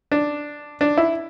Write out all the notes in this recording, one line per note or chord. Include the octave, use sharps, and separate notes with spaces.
D4
D4
E4